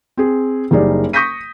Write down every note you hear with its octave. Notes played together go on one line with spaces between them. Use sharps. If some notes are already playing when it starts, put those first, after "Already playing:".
C4 G#4
F#1 G3 D#4 G#4 D5
C#6 D#6 G6 A#6 B6 D#7